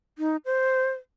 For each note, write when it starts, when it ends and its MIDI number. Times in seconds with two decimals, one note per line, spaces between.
0.18 0.36 63
0.45 0.90 72